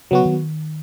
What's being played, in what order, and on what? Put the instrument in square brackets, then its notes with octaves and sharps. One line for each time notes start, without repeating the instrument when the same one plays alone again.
[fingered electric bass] C#3 [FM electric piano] F#3 B3 F#4
[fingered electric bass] D#3